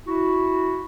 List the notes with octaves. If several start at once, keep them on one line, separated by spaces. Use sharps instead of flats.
E4 F#4